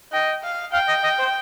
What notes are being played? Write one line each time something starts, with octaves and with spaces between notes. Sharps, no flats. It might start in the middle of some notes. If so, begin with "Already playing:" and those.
D#5 G5
F5
F5 G5
D#5
D#5
C5